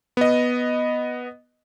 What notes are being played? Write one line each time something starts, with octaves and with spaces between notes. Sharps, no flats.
B3 D#5